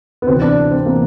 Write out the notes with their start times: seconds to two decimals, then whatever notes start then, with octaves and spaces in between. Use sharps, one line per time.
0.22 B3
0.27 D2 C3 E3 C4
0.42 D4
0.71 C4
0.86 C3 E3 A#3